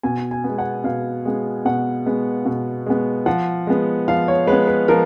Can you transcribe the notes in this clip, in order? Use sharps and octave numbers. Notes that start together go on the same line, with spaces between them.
B2 G#5
G#5
G#3 B3
F#5
B2 F5
G#3 B3
B2 F#5
G#3 B3
B2
G#3 B3
F3 F#5
G#3 B3
F3 F5
C#5
G#3 B3 B4
B4
F3 A#4